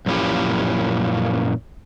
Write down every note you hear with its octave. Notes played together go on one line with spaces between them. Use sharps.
F#2 A#2 F3 C#4 E4 G4